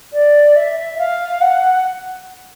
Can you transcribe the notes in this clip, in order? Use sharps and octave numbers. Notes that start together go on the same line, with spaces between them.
D5
E5
F5
F#5